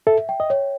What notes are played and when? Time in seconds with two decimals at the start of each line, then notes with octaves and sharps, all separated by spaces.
0.07 A4 E5
0.29 G5
0.40 D#5
0.50 C#5